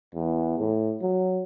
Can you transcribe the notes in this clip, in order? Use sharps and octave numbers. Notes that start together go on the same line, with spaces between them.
E2
A2
F#3